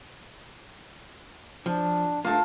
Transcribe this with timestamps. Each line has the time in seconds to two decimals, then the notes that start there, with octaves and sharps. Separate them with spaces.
1.66 F3 D4
2.25 G2 A3 A#3 F4 A5